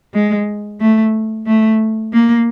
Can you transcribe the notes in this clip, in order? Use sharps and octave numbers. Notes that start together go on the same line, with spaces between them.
G#3
A3
A3
A#3